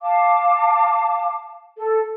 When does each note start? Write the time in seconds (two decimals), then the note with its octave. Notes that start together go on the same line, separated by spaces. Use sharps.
0.02 F5 A5 D6
1.77 A4